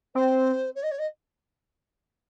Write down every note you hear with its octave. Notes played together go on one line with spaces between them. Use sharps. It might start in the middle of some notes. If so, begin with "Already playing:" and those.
C4 C5
C#5
D#5
C#5
D#5